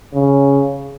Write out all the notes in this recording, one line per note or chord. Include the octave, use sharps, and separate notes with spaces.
C#3